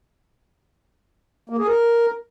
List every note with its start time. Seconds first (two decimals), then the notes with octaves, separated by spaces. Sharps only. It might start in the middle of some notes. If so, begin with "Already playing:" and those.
1.50 A#3
1.58 G#4
1.67 A#4